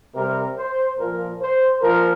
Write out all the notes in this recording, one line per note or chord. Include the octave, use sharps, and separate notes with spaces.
C3 G3 A#4
C5
A#2 F3 A#4
C5
A#2 F3 A#4